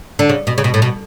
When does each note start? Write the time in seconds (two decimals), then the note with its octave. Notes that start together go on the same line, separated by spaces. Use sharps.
0.19 D3
0.29 C#3
0.47 B2
0.58 C#3
0.64 B2
0.74 A2
0.82 B2